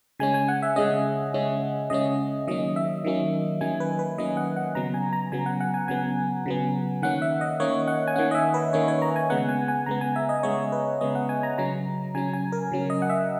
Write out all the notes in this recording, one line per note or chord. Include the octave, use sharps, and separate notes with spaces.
C#3 G#3 C#4 G#5
G#5
F#5
E5
C#3 G#3 C#4 D#5
C#3 G#3 C#4
C#3 G#3 C#4 D#5
D#3 F#3 A#3 C#4 D#5
E5
D#3 F#3 A#3 C#4
D#3 F#3 A#3 C#4 G#5
B4
B4
D#3 F#3 A#3 C#4 D#5
F#5
F#5
C#3 F#3 B3 A#5
G#5
A#5
C#3 F#3 B3 G#5
F#5
F#5
G#5
C#3 F#3 B3 G#5
C#3 F#3 B3
D#3 A#3 C#4 F#5
E5
D#5
D#3 A#3 C#4 C#5
F#5
G#5
D#3 A#3 C#4 F#5
D#5
E5
B4
D#3 A#3 C#4 C#5
C#5
A#5
G#5
C#3 G#3 B3 F#5
G#5
G#5
C#3 G#3 B3 A#5
G#5
E5
D#5
C#3 G#3 B3 C#5
B4
C#3 G#3 B3 D#5
F#5
G#5
A#5
C#3 F#3 C#4 A#5
C#3 F#3 C#4 G#5
G#5
A#4
C#3 F#3 C#4
D#5
F#5
E5